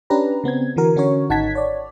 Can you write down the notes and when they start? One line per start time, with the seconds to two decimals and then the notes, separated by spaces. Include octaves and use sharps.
0.10 C#4 D4 G4 B4 A#5
0.44 C#3 B3 C4 G#6
0.76 D3 E3 F#4 A#4
0.96 D3 C#4 F#4 A#4 C#5
1.29 G#1 D#4 F#5 A5 G#6 B6
1.55 C#5 D5